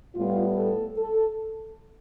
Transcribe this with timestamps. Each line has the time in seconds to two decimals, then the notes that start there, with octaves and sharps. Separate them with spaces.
0.15 A2 G3 B3 F4
0.56 A4
0.97 A4